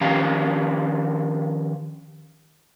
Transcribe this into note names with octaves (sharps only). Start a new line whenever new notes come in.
D#3 F3 C#4 G4 F5 A#5